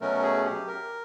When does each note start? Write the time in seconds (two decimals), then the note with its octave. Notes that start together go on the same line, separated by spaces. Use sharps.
0.01 B2 F#3 A3 C#4 A#4
0.23 G#4
0.46 G4
0.67 A#4